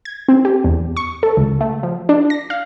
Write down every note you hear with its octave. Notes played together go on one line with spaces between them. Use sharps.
G#6
C4
G4
E2
C#6
A4
C#2
A3
F3
D4
A#6
F5